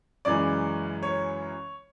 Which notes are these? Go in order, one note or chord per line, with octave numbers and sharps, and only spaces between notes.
F#2 C#3 E3 G#3 D5
C#5